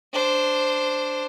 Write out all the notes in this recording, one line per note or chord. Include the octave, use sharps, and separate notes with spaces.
D4 C5